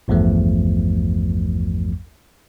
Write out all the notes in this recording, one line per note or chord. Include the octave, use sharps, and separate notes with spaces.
A1 E2 G2 F3 A3